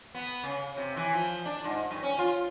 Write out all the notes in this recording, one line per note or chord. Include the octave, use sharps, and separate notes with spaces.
B3
C#3
C3
E3
F3
D4
G#2
G2
C#4
F4